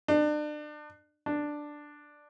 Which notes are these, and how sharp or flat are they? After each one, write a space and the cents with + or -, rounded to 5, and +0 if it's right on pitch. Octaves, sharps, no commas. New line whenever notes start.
D4 +35
D4 +5